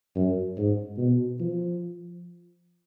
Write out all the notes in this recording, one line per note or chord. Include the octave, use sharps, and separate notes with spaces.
F#2
G#2
B2
F3